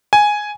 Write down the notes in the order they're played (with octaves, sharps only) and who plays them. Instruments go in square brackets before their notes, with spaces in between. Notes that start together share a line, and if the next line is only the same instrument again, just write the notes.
[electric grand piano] G#5